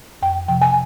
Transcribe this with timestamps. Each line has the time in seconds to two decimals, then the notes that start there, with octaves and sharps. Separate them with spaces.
0.22 F2 G5
0.48 C3 F3 G5
0.62 G#5